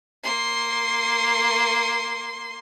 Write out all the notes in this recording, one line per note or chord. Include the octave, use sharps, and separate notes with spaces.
A#3 C6